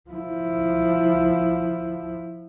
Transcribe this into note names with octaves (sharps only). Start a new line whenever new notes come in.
F3 E4